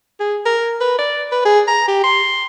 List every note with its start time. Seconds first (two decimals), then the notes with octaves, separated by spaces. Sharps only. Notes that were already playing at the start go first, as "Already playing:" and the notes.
0.20 G#4
0.46 A#4
0.81 B4
0.99 D5
1.32 B4
1.45 G#4
1.68 A#5
1.88 G4
2.04 C6